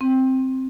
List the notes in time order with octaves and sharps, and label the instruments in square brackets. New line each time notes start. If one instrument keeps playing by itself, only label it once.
[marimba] C4